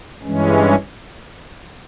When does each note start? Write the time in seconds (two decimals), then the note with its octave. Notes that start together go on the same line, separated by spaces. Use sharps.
0.23 G2 E3 G#3 C#4